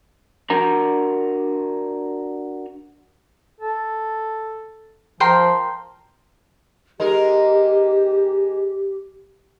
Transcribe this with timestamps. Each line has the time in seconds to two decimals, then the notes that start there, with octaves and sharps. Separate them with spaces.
0.50 D4 F#4 A#4 A#5
3.60 A4
5.20 F3 A#4 G5 C6
7.00 G#3 D#4 G4 A#4